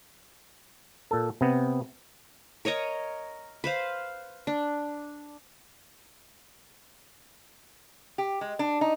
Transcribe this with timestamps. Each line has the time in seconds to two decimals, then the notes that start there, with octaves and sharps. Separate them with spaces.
1.11 A#2 A4
1.41 C3 B3
2.65 A#4 C#5 D#5 A#5
3.64 B4 C5 F5
4.47 D4
8.18 G4
8.41 G#3
8.59 D4
8.81 D#4